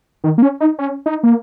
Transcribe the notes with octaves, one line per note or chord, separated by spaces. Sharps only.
D#3
A#3
C#4
D#4
C#4
D#4
A#3